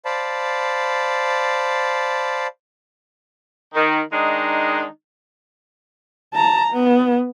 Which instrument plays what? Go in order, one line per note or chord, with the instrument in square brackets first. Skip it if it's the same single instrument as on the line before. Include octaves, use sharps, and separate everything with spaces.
[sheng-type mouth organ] C5 D5 F5 A5 B5
[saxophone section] D#3
D#3 G#3 D4 D#4
[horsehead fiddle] A5 A#5
B3